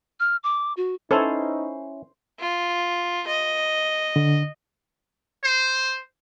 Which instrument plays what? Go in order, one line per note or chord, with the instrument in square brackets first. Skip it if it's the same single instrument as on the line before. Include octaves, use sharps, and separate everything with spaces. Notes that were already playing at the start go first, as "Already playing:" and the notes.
[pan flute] F6
D6
F#4
[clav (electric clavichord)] C#4 E4 [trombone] D#4 [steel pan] A4 C#5 [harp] C5
[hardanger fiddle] F4
D#5
[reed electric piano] D3
[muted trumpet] C5